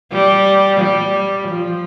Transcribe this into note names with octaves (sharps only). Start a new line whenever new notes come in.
G3
G3
F3